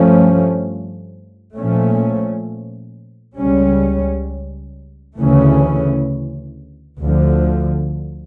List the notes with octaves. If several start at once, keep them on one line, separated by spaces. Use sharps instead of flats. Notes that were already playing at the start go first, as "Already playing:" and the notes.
Already playing: G2 F3 A3 C#4
A#2 F3 A3 C#4
C#2 C#3 G3 C#4
D2 C#3 E3 A3 C#4
D2 D3 F3